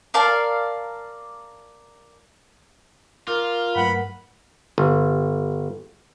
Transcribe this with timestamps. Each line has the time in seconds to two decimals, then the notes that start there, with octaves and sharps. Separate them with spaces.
0.14 A#4 D5 F5 A5
3.28 F4 A#4 D6 F6
3.76 G2 F#3 A3 B4 F#5 B5
4.78 G1